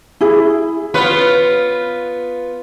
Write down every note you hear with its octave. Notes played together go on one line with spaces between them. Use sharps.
E4 G#4
B3 F4 B4 C#5